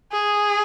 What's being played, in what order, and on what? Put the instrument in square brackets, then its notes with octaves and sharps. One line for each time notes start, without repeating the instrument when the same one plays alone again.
[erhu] G#4